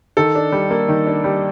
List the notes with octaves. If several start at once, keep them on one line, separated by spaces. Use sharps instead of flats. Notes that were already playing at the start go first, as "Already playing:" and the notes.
D#3 A4
D4
G3
A#3
D#3
D4
G3